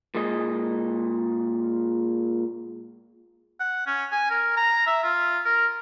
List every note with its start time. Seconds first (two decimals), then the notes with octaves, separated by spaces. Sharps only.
0.14 A#2 G#3 D#5
3.60 F#5
3.87 C#4
4.12 G#5
4.30 A#4
4.57 A#5
4.87 E5
5.03 F4
5.45 A#4